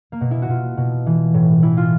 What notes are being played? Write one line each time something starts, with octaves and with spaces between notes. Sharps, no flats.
A#3
B2
E4
F#4
B2 F4
B2
E3
A2
E3 E4
F4